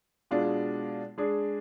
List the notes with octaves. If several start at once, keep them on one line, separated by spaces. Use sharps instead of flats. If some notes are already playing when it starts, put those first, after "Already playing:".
B2 G#3 D4 F4
G#3 D4 G#4